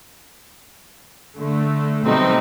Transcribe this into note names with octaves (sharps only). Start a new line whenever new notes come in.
D3 A3
B2 F#3 G3 A3 C4 D#4